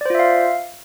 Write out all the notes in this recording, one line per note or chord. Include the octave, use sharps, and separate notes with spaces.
F4 C5 D5 E5 F5